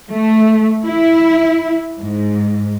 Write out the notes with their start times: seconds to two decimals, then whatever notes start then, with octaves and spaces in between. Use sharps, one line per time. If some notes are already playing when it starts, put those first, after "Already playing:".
0.11 A3
0.84 E4
2.01 G#2